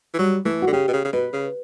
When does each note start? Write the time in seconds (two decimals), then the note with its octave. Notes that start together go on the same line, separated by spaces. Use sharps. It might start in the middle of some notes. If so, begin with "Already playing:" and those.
0.14 E3
0.18 F#3 G3
0.45 E3 A3
0.62 F#4
0.67 D3
0.72 C#3 G4
0.88 B2
0.93 C#3
1.05 C#3
1.13 B2 B4
1.33 C#3